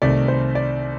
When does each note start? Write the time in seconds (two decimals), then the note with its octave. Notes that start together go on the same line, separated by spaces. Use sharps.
0.02 C2 C3 D#3 A3 D5
0.28 C5
0.55 D5